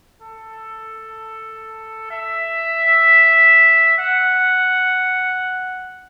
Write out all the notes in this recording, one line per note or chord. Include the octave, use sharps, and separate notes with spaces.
A4
E5
F#5